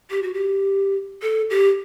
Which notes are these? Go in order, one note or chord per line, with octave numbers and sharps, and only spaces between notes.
G4
F#4
G4
A4
G4